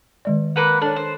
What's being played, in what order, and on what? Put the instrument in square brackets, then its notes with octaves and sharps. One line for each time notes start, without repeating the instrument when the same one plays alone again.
[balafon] D#3 G#3 D5
[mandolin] A#3 B4 F#5
[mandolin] D4 [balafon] A4 C#5
[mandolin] C5